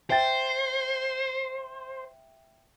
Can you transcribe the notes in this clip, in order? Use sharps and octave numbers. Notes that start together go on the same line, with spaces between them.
C5 E5 G5 A6